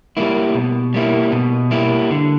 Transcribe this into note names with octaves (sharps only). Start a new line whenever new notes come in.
G3 A#3 E4
B2
G3 A#3 E4
B2
G3 A#3 E4
D3